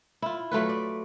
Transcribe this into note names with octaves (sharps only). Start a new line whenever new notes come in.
E4 F4
F#3 A3 F4 B4
D5